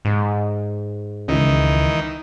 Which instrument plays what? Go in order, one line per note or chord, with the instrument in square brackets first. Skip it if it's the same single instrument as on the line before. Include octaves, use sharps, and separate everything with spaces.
[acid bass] G#2
[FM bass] C#2 [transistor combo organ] D#3 E3 D#4